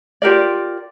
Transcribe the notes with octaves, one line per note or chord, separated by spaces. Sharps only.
F4 G4 A#4 D5